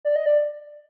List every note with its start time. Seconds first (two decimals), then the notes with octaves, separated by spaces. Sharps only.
0.05 D5
0.16 D#5
0.26 D5